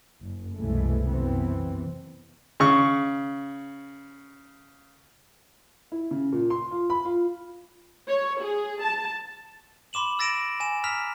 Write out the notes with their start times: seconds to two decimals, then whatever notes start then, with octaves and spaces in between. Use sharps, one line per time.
0.21 F#1
0.57 C2 F#2 B2 E3 G#3 A3
1.07 F#2 C3 E3 B3 C4
2.60 C#3 C#6
5.92 E4
6.11 C#3
6.33 A#2
6.50 C6
6.71 F4
6.90 B5
7.05 F4
8.08 C#5
8.42 G#4
8.83 A5
9.93 B5 C6 D6 E7 F#7
10.19 E6 A6 A#6 D7 E7
10.60 G#5 E7
10.84 A#5 E6 F6 B6 F7